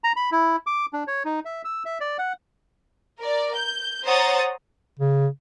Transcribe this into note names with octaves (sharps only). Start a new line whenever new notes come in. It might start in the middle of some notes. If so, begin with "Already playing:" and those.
A#5
B5
E4
D6
D4
C#5
D#4
E5
E6
E5
D5
F#5
A#4 D5
G6
C5 C#5 F#5 A#5 D#6 A6
C#3